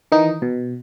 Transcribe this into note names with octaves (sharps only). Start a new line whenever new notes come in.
D#3 E3 D#4
B2